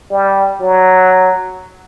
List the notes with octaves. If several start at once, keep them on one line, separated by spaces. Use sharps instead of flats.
G3
F#3